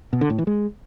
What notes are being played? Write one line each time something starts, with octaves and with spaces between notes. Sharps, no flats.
B2
D3
A2
E3
G#3